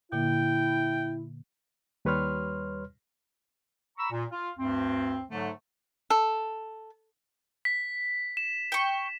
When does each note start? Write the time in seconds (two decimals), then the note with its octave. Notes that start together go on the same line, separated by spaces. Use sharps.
0.12 A#2 D3 A#3 E4 G5
2.05 D#2 G3 B4 C#5 C6 F6
3.97 A#5 B5 C#6 E6
4.11 A#2
4.30 F4
4.57 D2 G2 C4
5.30 G#2 D3 F#3 A3
6.10 A4
7.65 B6
8.37 E7
8.72 G5 C#6